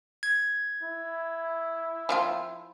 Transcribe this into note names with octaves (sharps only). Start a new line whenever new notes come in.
G#6
E4
F3 C4 F4